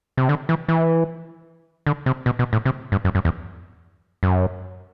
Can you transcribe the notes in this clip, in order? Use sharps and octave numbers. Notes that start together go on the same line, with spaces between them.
C3
D3
E3
E3
D3
C3
B2
B2
A2
C3
G2
F#2
F#2
E2
F#2